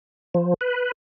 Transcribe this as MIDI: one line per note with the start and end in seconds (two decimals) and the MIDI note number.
0.34 0.54 53
0.61 0.91 71